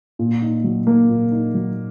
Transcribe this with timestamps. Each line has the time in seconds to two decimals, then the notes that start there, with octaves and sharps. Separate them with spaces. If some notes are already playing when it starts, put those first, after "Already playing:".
0.19 A#2
0.42 D#4
0.64 F#3
0.87 A#3
1.10 A#2
1.32 D#4
1.54 F#3